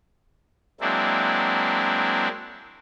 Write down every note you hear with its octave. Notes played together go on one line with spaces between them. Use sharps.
F#3 G#3 A#3 C4 D4 E4